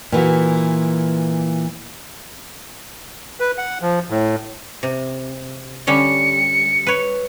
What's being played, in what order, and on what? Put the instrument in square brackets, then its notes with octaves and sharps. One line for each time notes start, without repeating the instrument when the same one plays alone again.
[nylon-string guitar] A#2 E3 F#4
[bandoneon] B4
F#5
F3
A2
[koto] C3
[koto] D3 G3 C#4 [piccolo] C#7
[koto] B4 C#5